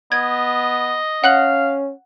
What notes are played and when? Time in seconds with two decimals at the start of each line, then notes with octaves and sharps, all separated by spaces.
0.12 B3 D#5 G#6
1.24 C#4 F5 F#5 F#6 F#7